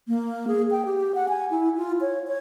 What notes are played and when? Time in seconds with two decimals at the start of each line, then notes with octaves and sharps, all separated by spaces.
0.08 A#3
0.47 G#4
0.71 G5
0.85 G4
1.15 F#5
1.28 G#5
1.50 E4
1.77 F4
2.01 C#5
2.27 C#5